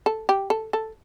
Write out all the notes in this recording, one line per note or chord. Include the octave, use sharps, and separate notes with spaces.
A4
G4
A4
A4